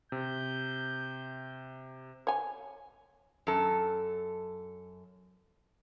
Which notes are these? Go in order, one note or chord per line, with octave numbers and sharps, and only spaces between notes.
C3 G6
C#5 G#5
F#2 A4